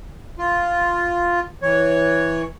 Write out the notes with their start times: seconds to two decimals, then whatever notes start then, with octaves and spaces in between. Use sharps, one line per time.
0.38 F4
1.62 E3 C#5